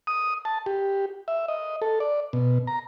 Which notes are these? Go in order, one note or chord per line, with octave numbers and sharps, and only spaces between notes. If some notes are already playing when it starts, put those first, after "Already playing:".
D#6
A5
G4
E5
D#5
A4
D5
B2
A#5